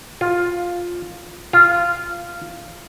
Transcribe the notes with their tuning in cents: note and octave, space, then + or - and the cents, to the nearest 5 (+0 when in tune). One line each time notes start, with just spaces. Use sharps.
F4 +10
F4 -10